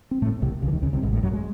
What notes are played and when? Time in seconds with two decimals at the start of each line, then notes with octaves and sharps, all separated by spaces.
0.11 C4
0.22 A2 A3
0.42 C2 C3
0.62 C#2 C#3
0.68 E3
0.72 D#2 D#3
0.82 C#2 C#3
0.93 C2 C3
1.02 G#1 G#2
1.13 A1 A2
1.23 F#2 F#3
1.33 G#3